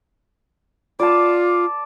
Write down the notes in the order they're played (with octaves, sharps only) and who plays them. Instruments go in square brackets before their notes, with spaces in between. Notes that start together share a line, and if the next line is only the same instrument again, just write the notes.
[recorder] F4 [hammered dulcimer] D5 A5